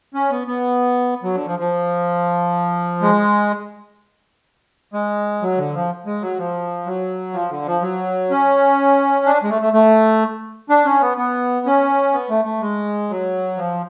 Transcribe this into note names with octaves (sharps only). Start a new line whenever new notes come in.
C#4
B3
B3
F#3
D3
F3
F3
G#3
G#3
F#3
D3
F3
G#3
F#3
F3
F#3
F3
D3
F3
F#3
C#4
D4
G#3
A3
A3
A3
D4
C#4
B3
B3
C#4
B3
A3
A3
G#3
F#3
F3